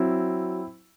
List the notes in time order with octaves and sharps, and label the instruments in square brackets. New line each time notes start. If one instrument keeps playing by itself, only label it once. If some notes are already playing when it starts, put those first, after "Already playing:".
Already playing: [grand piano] F#3 C4 E4